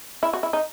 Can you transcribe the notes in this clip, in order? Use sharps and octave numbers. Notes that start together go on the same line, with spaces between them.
E4
F#4
E4
D#4